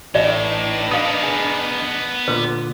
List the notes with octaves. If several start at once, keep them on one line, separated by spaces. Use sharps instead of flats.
A1 A2 D4 D#4 B4 D5 E5
B3 A#4 F5 D#6
G#4
A#2 D3 B4